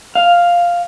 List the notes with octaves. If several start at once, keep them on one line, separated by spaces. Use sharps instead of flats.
F5